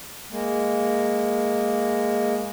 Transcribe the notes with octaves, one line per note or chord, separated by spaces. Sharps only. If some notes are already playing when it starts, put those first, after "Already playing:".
G#3 A#3